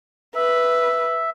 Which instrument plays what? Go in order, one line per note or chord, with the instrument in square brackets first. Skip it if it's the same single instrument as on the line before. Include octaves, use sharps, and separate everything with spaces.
[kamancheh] B4 [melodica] E5